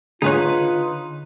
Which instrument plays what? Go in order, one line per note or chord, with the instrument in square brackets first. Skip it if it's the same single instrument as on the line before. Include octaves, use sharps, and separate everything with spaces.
[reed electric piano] D3 [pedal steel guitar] D#4 B4 F#6 [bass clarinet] F4 [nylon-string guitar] G#4 C#5